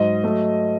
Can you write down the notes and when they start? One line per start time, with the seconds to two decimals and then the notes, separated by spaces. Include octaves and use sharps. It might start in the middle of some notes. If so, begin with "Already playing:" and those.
Already playing: G#2 F#3 D#5
0.24 F#3 A3